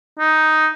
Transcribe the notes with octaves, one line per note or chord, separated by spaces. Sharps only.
D#4